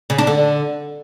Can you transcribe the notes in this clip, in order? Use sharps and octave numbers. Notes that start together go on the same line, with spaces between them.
C#3
D4
D3